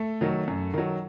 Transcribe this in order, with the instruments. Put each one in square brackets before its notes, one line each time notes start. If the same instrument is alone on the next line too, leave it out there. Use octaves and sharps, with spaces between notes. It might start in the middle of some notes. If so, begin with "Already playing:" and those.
Already playing: [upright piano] A3 A4
D#3 F#3
F#2
D#3 F#3